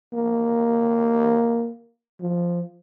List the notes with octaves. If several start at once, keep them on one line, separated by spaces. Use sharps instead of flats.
A#3
F3